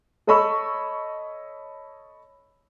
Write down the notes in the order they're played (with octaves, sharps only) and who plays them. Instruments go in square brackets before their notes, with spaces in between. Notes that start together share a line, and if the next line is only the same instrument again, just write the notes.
[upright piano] A4 C#5 D#5 B5 C#6 E6